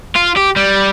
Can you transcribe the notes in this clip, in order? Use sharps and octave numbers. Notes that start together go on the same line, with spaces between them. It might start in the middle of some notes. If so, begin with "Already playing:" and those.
F4
G4
G3